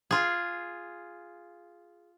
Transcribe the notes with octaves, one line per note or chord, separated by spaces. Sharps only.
F4 G#4